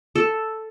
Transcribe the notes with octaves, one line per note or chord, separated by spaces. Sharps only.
A4